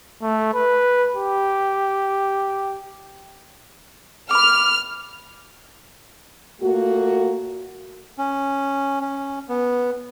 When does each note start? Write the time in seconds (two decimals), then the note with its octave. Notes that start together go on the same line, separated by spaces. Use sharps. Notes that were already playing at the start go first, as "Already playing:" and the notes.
0.22 A3
0.54 B4
1.15 G4
4.31 B5 D6 F6
6.62 A#2 A3 A#3 F#4
8.19 C#4
9.01 C#4
9.49 B3